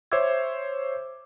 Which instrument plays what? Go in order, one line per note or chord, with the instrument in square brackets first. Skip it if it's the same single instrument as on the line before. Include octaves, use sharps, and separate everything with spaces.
[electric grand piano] C5 C#5 E5 D6 E6 G#6